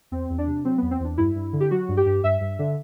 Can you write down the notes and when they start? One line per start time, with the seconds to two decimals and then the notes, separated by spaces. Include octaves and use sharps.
0.11 E2 C4
0.30 E2
0.38 D4
0.47 C3
0.65 F#3 C4
0.78 E2 B3
0.91 C4
1.00 E2 D4
1.18 G2 E4
1.35 G2
1.53 D3
1.60 G4
1.71 F#3 F#4
1.89 G2
1.97 G4
2.06 G2
2.24 G2 E5
2.41 G2
2.59 D3